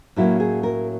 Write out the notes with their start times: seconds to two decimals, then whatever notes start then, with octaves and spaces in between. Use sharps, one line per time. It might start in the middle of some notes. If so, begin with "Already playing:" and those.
0.16 A2 F#3 A#3 C#4 E4
0.40 G#4
0.63 A#4